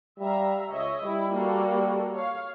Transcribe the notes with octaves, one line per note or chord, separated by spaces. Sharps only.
G3 E5 F5 A#5
C#2 C#5 D#5 E5
G3 E4
A#3 F#4 A4
C#5 F5